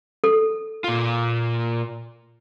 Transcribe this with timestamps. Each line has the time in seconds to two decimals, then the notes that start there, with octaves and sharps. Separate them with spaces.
0.24 A4
0.84 A#2 F4